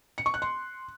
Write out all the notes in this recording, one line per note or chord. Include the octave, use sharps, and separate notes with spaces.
C#7
C#6
F#6
C6